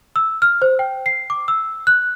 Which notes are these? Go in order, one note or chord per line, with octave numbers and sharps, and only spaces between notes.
E6
F6
C5
G5
C7
D6
E6
F#6